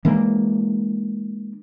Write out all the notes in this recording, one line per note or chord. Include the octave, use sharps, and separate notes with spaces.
E3 G#3 A#3 D4